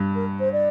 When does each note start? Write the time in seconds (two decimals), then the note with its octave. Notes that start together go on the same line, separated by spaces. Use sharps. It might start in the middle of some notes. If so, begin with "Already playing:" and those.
Already playing: G2
0.15 A#4
0.40 C5
0.52 D5